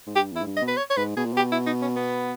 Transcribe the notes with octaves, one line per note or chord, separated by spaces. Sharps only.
G#2
G2 G4
E2 E4
G#2
G2
D#5
B2
B4
C#5
C#5
G#2 B4
B2 G#4
A#2
B2 G4
E4
D#4
C#4
B3